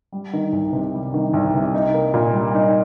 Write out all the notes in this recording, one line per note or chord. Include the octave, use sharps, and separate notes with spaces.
G3
D#3
C2
C3
G3
D#3
C2
C3
D#4
A#3
A#2
G3
D#4